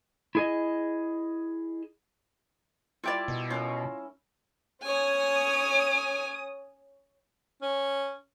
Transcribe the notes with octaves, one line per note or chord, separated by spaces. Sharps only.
E4 G#4 D#5
G3 E4 F4 G4 A#4 D5
B2
C#4 F4 A#4
C#4 C#5 G#5 D#6
C#4